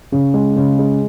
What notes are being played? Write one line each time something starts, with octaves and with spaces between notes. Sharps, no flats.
C#3
G#3
C#3
G#3